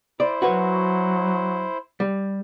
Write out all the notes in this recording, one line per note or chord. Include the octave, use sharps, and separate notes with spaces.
E4 C5 D5
F#3 F#4 B4 C#5
G3